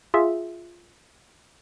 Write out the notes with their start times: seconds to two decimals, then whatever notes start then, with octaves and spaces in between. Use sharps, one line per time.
0.14 F4 G#4 E5